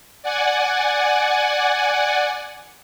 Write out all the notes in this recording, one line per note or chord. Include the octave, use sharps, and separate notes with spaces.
D5 F#5 G#5